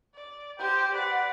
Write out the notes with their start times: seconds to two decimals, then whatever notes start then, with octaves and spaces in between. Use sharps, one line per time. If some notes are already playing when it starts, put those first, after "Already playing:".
0.15 D5
0.59 G4 C5 G5
0.94 B4 D5 F#5